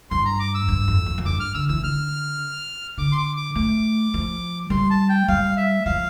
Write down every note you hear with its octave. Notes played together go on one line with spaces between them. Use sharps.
G2 C6
A#5
D6
E6
G2
F2
F2
F2
G2 D6
F6
D3 E6
E3 E6
D3 F6
D3 D6
C6
D6
D6
A3 D6
F3
G3 C6
A5
G5
G3 F5
E5
F3 F5